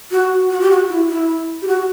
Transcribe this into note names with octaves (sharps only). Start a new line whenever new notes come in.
F#4
F#4
G4
F#4
E4
E4
G4
F#4